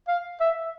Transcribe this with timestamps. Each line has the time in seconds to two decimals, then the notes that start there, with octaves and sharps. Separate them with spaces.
0.08 F5
0.40 E5